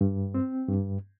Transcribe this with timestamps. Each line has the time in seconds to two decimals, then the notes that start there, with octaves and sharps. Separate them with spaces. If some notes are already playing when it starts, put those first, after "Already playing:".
0.01 G2
0.34 C4
0.68 G2